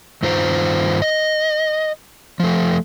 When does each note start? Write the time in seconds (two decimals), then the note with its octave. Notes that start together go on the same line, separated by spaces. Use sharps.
0.23 G2 D#3 F4 C5 A#5
1.02 D#5
2.40 F3 A3